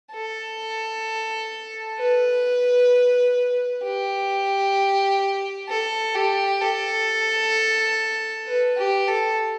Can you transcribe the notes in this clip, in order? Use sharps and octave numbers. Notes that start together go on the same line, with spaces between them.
A4
B4
G4
A4
G4
A4
B4
G4
A4